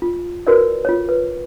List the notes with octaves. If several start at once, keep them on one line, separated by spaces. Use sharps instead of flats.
F4
E4 F#4 A#4 B4 C#5 D5
F4 C#5
B4